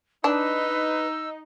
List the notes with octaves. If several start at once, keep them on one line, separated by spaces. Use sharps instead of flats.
D4 D#4 B4 E6